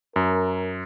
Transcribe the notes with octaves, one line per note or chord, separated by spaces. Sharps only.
F#2 A#4